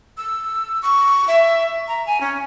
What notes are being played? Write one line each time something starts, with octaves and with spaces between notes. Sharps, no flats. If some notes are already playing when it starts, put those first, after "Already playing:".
E6
C#6
E5
A#5
G#5
C#4